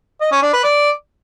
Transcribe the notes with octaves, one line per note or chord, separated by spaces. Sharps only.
D#5
C#4
D4
B4
D5